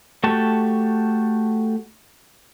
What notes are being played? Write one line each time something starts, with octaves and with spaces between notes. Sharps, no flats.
A3 F#4 G4 A5